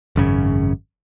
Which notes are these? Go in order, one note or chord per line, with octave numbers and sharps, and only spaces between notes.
G#1 F#2 C#3